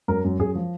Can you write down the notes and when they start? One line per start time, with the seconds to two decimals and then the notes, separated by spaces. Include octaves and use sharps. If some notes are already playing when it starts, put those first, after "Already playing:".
0.08 F#2 A#4
0.24 F#2
0.39 F#2 G#4
0.55 F3